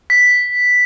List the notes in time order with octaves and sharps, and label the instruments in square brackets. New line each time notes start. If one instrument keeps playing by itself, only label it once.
[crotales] B6